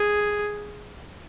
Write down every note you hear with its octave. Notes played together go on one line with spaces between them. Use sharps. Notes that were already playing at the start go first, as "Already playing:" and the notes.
Already playing: G#4